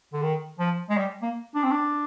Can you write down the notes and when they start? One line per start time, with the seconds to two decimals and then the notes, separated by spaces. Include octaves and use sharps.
0.13 D3
0.22 D#3
0.59 F3
0.90 G#3
0.98 G3
1.22 A#3
1.55 D4
1.64 C4
1.71 D4